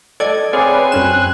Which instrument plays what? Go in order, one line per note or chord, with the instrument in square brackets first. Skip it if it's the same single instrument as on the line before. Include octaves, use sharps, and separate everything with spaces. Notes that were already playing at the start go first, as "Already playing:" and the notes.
[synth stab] A4 G#6 [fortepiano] D5 D#5
[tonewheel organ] C4 G#5 [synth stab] G#4 D5 F5 [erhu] B4 [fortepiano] C#5
[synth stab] F#2 C#4 E7 [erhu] F#6